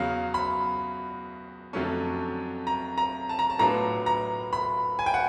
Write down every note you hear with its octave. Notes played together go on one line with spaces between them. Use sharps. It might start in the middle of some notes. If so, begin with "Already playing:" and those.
Already playing: E2 C#3 F#3 F5
B5
F2 D3 F#3 A3 C#4
A#5
A#5
A5
A#5
A5
A2 F#3 B3 D4 F4 A#5
A#5
B5
G#5
G5
F#5